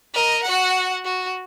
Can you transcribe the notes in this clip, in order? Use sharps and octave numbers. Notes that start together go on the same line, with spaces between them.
A#4 D#5
F#4 F#5
F#4